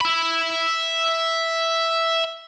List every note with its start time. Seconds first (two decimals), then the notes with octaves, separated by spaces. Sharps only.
0.01 E5 B5